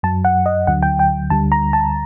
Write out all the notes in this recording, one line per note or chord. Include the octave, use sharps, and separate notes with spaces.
F#2 F#3 A5
F#5
D#5
D2 D3 F#3 F#5
G5
G5
D2 D3 G3 A5
A#5
A5